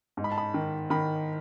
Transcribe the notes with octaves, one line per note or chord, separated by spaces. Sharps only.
G#2
B5
A5
B5
D#3
D#3 B5